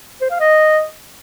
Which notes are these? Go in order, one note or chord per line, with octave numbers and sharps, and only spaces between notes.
C5
F5
D#5